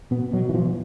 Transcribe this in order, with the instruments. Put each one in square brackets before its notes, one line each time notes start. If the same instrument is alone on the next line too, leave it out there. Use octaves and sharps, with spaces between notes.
[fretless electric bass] B2 B3
B2 F#3
E3
B2 F3